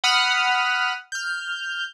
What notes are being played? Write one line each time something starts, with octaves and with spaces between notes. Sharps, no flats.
F#5 B5 D#6 F6
F6 G6